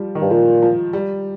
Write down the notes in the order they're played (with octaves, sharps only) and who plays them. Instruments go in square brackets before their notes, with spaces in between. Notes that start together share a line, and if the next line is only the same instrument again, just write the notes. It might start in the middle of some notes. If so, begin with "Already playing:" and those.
Already playing: [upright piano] F3 G3
D#3
[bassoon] G2
[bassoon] A#2 [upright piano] F3
[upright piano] F3
G3